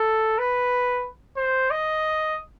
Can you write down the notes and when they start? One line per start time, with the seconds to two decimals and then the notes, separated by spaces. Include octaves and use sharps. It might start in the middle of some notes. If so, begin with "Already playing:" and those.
Already playing: A4
0.38 B4
1.37 C5
1.71 D#5